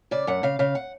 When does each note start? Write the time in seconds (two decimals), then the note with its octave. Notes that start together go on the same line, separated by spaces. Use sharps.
0.11 C#3 D5
0.27 F#2 F#5
0.43 C#3 F5
0.59 C#3 F5
0.75 F#5